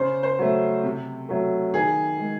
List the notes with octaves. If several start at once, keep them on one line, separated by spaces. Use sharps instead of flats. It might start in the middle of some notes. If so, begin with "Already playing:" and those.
Already playing: C#3 C5
C5
F#3 A3
C3
F#3 A3
D#3 G#4
G#3